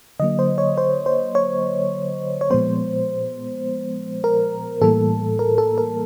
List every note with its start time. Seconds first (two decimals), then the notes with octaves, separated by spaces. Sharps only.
0.20 D3 F#3 A#3 D#5
0.39 C5
0.58 C#5
0.78 C5
1.06 C5
1.35 C#5
2.41 C#5
2.50 A#2 F3 G#3 B3 C5
4.24 A#4
4.81 A2 E3 G3 A#3 A4
5.39 A#4
5.58 A4
5.78 A#4